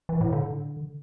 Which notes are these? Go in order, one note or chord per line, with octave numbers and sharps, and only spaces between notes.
E3
A2
D3